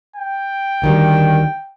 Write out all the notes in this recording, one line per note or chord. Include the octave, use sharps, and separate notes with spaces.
G5
D2 D#3 G3